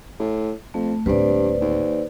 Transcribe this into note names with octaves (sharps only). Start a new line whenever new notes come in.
A2
F2 A3
D1 G2 A#3 B4 C5 D5
D#2